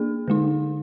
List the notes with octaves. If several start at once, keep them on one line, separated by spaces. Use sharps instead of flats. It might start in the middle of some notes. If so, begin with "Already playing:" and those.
Already playing: A#3 D4 G#4
D3 G#3 D#4